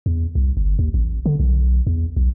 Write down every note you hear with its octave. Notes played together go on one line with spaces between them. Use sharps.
E2
C2
G1
D#2
A1
D3
B1
E2
B1